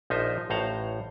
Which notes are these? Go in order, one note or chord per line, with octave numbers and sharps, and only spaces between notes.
A#1 F3 D#4 C5 E5
A1 A2 C5 F5 F#5 A#5